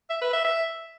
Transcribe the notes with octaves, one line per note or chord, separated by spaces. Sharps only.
E5
B4
E5
E5